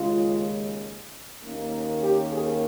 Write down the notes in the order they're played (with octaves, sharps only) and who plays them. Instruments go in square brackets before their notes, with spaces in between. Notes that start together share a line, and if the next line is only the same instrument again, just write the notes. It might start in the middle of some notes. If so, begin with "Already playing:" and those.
Already playing: [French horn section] D#2 C#3 G#3 F4
D#2 D#3 A#3 C#4
G4
G#4